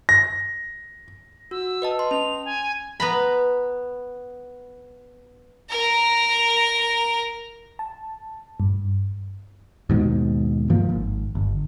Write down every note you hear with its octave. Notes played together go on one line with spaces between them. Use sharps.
A#6
F#4 E6
B4 D#5 A5
C6
C#4 F7
G#5
B3 A#5 B5
A#4 A#5
A5
G2
D#2 G#2 B2
G2 D#3 F3 A#3
G#1
G1